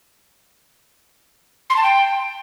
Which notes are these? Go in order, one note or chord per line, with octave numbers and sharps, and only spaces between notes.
C6
A5
G5